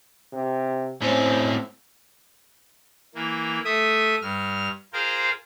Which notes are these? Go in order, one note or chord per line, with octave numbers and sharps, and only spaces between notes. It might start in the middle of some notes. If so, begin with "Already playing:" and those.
C3
A2 C4 C#4
E3 A#3
A3 E5 D#6
G2 F6
F4 G#4 A#4 C5 F5 G5